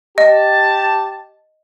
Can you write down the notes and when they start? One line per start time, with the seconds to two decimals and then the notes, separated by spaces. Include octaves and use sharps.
0.18 G4 D#5 A5